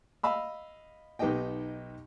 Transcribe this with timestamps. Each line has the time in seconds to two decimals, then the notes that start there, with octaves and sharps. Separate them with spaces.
0.23 D#5 F5 B5 E6
1.19 B1 B3 D#4 G4 D#5 G5